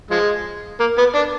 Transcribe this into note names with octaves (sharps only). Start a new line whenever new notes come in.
F3 G#3
A#3
B3
D4